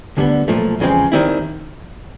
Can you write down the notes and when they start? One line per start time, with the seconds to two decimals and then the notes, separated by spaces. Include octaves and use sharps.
0.17 D2 D3 G3 B3
0.48 B1 A#2 F3 A3
0.80 E2 C#3 F3 G#3 C4
1.12 D#2 D#3 G3 C4 E4